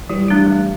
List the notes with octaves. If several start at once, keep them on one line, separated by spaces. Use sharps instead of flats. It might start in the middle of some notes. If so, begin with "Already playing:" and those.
E3 F#3 G3
A3 D4 G4
A3